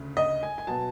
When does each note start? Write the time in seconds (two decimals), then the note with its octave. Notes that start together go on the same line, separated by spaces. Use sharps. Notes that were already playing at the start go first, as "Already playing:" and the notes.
Already playing: D2 C#3
0.17 D#5
0.43 G#5
0.58 G#5
0.67 B2 F#3 A5